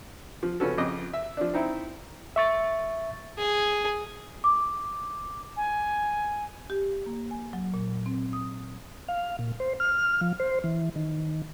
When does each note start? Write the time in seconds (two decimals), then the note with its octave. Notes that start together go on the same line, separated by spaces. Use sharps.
0.43 F3
0.60 C#3 F3 B3 C#4 F#4 A4
0.78 F2 C#3 D#5 D6
1.13 E5
1.37 F3 D4
1.54 C4 D#4 E4
2.36 E5 C#6 A6
3.38 G#4
4.44 D6
5.56 G#5
6.70 G4
7.06 A#3
7.31 G#5
7.53 F#3
7.74 A#2
8.06 C4
8.33 D#6
9.08 F5
9.39 A#2
9.60 C5
9.80 F6
10.21 F3
10.40 C5
10.64 E3
10.96 D#3